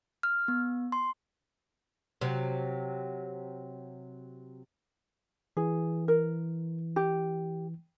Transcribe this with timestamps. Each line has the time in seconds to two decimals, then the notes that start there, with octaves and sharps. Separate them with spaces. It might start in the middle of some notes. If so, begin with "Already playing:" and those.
0.23 F6
0.48 B3
0.92 C6
2.21 C3 F#3
5.57 E3 G#4
6.08 A#4
6.96 G4